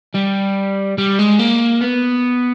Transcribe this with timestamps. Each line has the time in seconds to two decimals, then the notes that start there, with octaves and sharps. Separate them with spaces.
0.15 G3
0.98 G3
1.19 G#3
1.39 A#3
1.81 B3